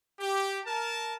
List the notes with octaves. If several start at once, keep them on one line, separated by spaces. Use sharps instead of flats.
G4
A#4 A5